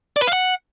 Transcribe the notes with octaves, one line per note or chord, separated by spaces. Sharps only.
D5
B4
F5
F#5